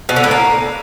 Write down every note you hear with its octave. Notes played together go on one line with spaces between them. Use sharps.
B2
D3
A2
A#3